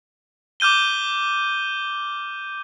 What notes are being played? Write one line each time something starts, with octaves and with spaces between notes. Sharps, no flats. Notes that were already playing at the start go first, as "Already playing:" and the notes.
D6 F6 G6 D#7 G7